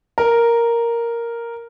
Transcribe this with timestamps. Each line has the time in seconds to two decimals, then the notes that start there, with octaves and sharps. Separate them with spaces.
0.18 A#4